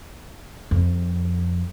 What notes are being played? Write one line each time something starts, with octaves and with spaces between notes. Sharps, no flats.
F2